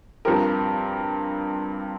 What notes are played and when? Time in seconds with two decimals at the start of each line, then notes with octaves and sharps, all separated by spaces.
0.25 G2 F3 C4 G4 A#4